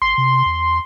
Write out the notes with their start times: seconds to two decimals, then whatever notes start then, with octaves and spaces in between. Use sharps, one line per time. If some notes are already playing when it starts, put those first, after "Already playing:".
0.02 G#1 C6
0.18 C3
0.46 E2